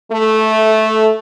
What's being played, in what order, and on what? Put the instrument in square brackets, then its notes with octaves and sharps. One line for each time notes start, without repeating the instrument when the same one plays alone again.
[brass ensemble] A3